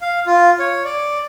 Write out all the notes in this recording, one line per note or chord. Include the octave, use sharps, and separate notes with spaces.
F5
F4
C#5
D5